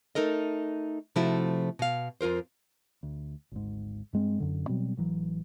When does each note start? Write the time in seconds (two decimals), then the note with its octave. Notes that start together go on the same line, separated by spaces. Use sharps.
0.15 A3 D#4 A4 A#4 D#5
1.16 C3 F3 A3 C4 E4 F#4
1.79 B2 F5
2.21 F2 F4 A#4 C5
3.03 D2
3.52 G#1 D2 G#2
4.13 G2 G#3 C4
4.40 F#2 D3
4.67 B2 F#3 G3 C4
4.97 A1 E3 F#3